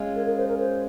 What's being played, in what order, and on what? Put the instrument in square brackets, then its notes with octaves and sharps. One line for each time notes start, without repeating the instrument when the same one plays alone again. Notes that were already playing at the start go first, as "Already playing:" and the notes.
Already playing: [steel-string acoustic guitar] G#3 C#4 F4
[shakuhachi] A#4
A#4
C5
A#4
C5